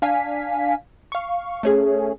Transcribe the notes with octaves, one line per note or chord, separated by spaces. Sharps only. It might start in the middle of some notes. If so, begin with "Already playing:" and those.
D4 F5 G#5 B6
F5 C#6
A3 C#4 G#4